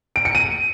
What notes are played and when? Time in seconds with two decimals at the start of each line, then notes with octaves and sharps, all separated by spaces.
0.16 D7
0.25 C#7
0.35 D#7